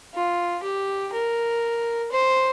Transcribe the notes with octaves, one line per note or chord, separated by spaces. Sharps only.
F4
G4
A#4
C5